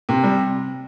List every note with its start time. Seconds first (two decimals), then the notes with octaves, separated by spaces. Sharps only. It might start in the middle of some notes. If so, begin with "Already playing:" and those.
0.09 C3
0.23 G3